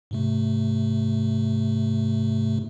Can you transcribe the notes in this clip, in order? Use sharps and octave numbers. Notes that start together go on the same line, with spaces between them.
G#2 C3 A3